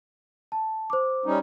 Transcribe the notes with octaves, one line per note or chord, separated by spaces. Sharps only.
A5
C5 D6
G3 C#4 D#4